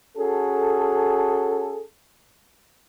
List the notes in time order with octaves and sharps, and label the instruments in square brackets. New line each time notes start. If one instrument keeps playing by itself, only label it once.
[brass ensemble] C#4 F#4 G#4 A4